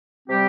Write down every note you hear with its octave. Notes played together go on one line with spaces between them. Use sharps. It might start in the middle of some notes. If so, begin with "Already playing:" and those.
C3 G3 C4 G4